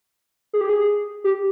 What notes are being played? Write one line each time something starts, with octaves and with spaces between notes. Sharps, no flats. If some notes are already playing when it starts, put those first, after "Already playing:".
G#4
G4
G#4
G4